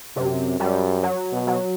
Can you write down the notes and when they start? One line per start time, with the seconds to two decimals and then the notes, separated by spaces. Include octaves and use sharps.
0.16 F#2 C3
0.59 F#2 G3
1.03 F#3
1.33 B2
1.47 F#3